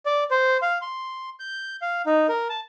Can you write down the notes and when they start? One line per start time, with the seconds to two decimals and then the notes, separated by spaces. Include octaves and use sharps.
0.06 D5
0.31 C5
0.62 F5
0.82 C6
1.40 G6
1.82 F5
2.06 D#4
2.29 A#4
2.49 A5